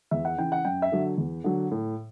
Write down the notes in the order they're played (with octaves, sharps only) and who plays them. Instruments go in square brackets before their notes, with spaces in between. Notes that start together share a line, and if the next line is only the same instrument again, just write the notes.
[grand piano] E2 E5
F#5
C#3 E3 G5
F#5
F#2 G5
E5
D3 F#3
E2
D3 F#3
A2